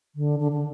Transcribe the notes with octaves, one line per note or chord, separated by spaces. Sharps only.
D3
D3
D3